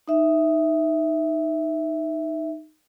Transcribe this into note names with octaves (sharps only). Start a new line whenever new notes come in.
D#4 E5